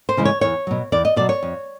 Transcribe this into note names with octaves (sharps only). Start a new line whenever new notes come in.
C5
C#3 E3 G#3
C#5
E2 C#5
B2 F#3
E2 D5
D#5
B2 F#3 D5
C#5
F2